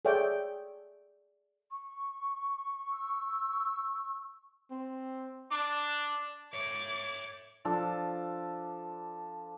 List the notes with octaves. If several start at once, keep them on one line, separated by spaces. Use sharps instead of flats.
G#4 A4 C#5 D5 E5 G5
C#6
E6
C4
D4 D6
C#5 E5 D6 G#6
F3 D4 A4